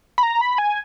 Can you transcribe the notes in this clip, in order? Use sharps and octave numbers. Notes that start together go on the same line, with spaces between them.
B5
A#5
B5
G#5